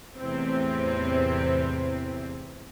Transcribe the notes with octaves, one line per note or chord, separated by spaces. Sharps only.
E2 A2 C3 E3 C4